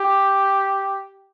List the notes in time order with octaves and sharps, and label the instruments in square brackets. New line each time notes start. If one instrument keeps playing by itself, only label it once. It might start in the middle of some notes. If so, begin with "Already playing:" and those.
Already playing: [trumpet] G4